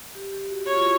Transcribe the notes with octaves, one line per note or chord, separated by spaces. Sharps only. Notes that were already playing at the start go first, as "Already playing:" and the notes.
G4
G4
F#4
F#4 C#5
F4
E4